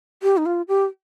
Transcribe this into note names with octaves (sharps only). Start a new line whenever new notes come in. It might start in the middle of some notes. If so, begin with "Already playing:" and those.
G4
D#4
F4
G4